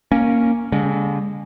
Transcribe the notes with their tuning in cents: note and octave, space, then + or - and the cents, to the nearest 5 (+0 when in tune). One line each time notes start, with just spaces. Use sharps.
A#3 +0 C#4 -5
D3 -45 G#3 -30